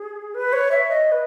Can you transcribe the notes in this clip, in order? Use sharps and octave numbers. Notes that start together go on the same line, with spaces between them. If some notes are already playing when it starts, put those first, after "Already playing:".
Already playing: G#4
B4
C#5
E5
D#5
B4